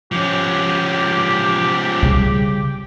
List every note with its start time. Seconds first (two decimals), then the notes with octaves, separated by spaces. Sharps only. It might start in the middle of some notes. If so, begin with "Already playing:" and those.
0.12 F3 C#4 G4
2.02 C#3 G3